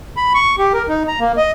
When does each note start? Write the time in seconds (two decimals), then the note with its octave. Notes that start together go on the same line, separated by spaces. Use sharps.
0.17 B5
0.34 C#6
0.58 G4
0.73 A#4
0.89 D#4
1.08 A#5
1.20 A#3
1.37 D#5